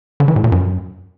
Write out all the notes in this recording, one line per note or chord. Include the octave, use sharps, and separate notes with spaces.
D3
E3
A2
A#2
F#2